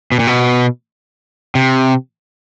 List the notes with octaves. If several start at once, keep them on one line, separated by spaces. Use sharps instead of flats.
B2
A#2
B2
C3